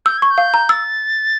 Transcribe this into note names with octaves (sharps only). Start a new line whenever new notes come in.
E6 G6
C#6 G#6
G6
F5
A#5
E6 A6